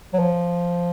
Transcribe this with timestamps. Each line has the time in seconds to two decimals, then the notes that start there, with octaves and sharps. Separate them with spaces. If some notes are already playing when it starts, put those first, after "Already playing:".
0.13 F#3
0.19 F3